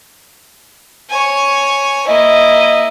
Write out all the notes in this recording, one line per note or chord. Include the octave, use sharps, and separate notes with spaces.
C#5 G#5
A#3 E4 D#5